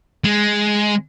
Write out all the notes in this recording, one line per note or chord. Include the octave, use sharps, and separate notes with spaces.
G#3